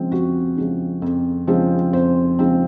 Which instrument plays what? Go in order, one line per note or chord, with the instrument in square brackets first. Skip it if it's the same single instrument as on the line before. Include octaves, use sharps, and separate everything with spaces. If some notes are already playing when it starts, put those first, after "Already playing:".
Already playing: [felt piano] C#3 F3 G#3 C4
F2 F#4
C#3 F3 G#3 C4
F2
C#3 F3 G#3 C4
F2 C5
C#3 F3 G#3 C4